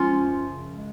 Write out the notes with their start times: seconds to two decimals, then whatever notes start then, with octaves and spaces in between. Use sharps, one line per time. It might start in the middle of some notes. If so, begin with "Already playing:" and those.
Already playing: F3 G#3 C#4 F4
0.13 F#2
0.42 C#3
0.73 G#3